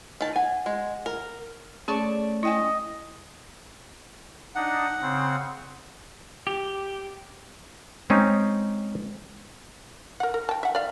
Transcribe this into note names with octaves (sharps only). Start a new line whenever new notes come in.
D#3 A5
F#5 G#5
G#3
A#4
A3 C#4 G#4 D5 A5 C#6
E4 D#5 G5 G#5
D4 D#4 F#5
C#3 C4
G4
G#3 C4 C#4 D#4
A#4 F#5
A#4
G5 A5
E5 F#5
D5 F5